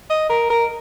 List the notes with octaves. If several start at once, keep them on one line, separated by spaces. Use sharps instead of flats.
D#5
A#4
A#4